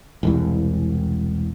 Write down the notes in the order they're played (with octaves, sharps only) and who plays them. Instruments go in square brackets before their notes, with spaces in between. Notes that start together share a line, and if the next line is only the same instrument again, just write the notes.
[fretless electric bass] E1 C2